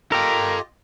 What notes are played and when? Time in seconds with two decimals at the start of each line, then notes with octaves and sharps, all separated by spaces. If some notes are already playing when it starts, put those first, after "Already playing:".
0.12 F4 G4 A4 A#4 D#5 G5